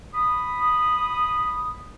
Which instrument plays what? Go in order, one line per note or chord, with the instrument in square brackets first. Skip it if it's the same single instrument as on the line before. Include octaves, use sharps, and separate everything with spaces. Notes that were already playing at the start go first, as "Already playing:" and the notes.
[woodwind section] B5 D#6